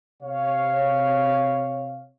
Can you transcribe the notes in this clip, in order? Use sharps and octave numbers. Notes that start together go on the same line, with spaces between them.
C3 C#5 F5